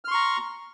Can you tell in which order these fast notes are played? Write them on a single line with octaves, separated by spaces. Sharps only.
F6 C6 C#6 A#5